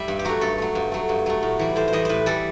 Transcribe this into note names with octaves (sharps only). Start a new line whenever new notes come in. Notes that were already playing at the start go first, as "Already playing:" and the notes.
Already playing: G3 E5
G2
G4
F#3 A3 F#4
G2 A4
F#3 A3
G2
F#3 A3
G2
F#3 A3
A2
E3 G3
A2 C5
C5
E3 G3 D#5
A2 B4 C5
E3 G3 A4